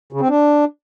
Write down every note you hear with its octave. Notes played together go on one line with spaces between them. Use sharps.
C#3
C4
D4